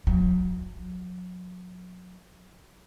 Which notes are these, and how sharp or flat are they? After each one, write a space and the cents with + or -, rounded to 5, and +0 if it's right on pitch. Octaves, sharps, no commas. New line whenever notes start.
F#3 -35